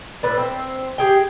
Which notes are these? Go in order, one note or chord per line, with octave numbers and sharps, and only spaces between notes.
A2 B4 D5
C4 E5
G4 G#4 G5